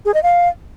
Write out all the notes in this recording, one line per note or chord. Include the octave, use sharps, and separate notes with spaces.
G#4
D#5
F5